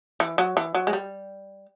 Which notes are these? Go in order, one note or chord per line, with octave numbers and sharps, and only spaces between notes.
E3
F#3
E3
F#3
G#3
G3